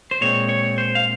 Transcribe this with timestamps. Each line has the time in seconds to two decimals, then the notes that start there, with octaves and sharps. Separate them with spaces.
0.11 C5
0.21 A#2 G#3 C4 C#5
0.49 C#5
0.78 C5
0.95 F5